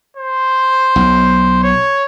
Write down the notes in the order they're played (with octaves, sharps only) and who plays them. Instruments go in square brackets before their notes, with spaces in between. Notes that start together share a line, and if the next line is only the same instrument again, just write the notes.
[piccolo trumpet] C5
[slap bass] B1
[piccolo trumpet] C#5